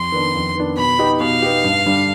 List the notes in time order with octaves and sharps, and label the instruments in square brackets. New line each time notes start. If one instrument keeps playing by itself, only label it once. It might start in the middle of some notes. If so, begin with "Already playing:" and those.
Already playing: [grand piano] F2 [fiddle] C6
[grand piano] D#3 B3 D4
F2
D#3 B3 D4
[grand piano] B2 [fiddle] B5
[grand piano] B3 D#4 G4
[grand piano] B2 [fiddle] F5
[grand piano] B3 D#4 G4
G2
D3 G3 D4